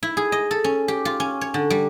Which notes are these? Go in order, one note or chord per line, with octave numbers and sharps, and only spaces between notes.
E4
G#4
D#5
A4
C#4
G4
F4
C#4
C#5
D3
G3